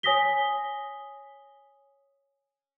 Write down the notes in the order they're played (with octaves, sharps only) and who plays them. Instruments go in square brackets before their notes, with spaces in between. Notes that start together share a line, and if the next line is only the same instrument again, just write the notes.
[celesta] C#5 G#5 D#6 A#6 B6 G7